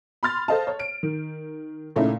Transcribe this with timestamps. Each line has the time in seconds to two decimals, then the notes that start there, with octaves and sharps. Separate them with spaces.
0.23 B5 C6 F6 A6
0.48 A4 C5 D#5 F5 A5
0.67 C#5
0.79 D7
1.03 D#3
1.96 A#2 C#3 A3 C#4 D#4 E4